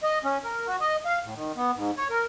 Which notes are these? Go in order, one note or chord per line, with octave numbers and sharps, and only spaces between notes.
D#5
C#4
A#4
F#4
D#5
F5
A2
D#3
B3
G#2
C#5
A#4